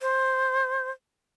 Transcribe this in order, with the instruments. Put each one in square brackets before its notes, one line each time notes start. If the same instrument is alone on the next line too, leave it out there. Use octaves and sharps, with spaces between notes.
[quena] C5